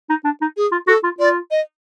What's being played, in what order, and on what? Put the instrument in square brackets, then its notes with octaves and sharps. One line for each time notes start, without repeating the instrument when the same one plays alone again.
[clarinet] D#4
D4
D#4
[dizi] G#4
[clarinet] F4
[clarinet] F#4 [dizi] A4
[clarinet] F4
[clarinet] F4 [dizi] D5
[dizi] D#5